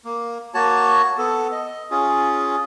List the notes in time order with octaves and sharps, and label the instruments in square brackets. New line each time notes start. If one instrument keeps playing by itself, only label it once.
[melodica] A#3
A#3 F#4 C#5 A5
B3 A4
D#5
C#4 F4 G#4